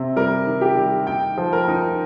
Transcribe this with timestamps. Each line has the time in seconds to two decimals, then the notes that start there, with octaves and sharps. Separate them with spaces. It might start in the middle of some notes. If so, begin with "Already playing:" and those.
Already playing: C3
0.16 G3 A#4
0.46 D#3
0.61 G4
0.77 G3
1.07 D#4 G5
1.38 F3
1.53 A#4
1.68 D#4